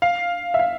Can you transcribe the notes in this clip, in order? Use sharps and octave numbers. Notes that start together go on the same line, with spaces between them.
F5
E5
F5